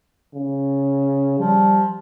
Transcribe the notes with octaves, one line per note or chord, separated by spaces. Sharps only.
C#3
F3 G3